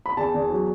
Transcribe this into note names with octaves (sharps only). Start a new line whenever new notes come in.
B5
E2 A5
E2
F#3